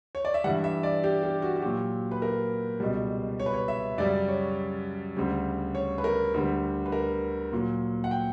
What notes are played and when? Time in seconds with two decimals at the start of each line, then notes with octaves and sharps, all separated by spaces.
0.15 C#5
0.25 D5
0.34 E5
0.44 G2 E3 G3 F#5
0.64 E5
0.83 D5
1.04 G4
1.23 G4
1.42 F#4
1.56 F#4
1.62 A#2 F#3 G4
2.11 B4
2.22 A#4
2.80 C#2 B2 G3
3.40 C#5
3.46 B4
3.54 C#5
3.68 E5
3.98 F#2 C#3 G3 D5
4.28 C#5
5.17 D2 C#3 G3
5.75 C#5
5.98 B4
6.04 A#4
6.34 D2 D3 G3
6.86 B4
6.92 A#4
7.52 A#2 F#3
8.04 F#5
8.11 G5